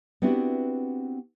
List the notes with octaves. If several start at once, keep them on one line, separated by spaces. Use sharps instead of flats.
B3 C4 D4 E4 F#4 G4